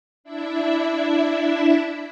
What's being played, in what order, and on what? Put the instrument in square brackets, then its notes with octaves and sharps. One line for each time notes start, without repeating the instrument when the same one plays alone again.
[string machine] D4 E4 E5